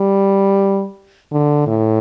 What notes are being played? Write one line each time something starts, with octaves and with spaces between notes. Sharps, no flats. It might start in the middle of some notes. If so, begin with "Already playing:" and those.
Already playing: G3
D3
A2